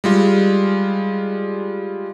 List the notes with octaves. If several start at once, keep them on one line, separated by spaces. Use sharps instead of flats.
G3 G#3 F4